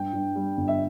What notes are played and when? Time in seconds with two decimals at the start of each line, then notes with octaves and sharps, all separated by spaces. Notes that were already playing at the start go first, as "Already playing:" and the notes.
Already playing: G2 G5
0.13 G2
0.36 G3
0.57 G1
0.68 E5